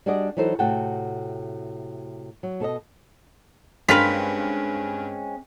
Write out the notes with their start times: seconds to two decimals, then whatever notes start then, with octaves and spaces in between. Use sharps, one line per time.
0.06 G3 D4 F#4 G#4 D5 D#5
0.37 E3 F#3 D#4 A4 C5
0.59 A2 C3 F#4 F#5 G5 A5
2.43 F#3
2.60 B2 A4 D5 D#5
3.88 G2 G#3 C4 C#4 F4 A#4 B4 B6